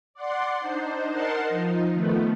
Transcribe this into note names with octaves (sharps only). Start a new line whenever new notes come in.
D5 F#5 C6
D4 D#4 C5
D#4 A#4 F#5 A5 C6
F3 D#4
D#3 F3 A3 B3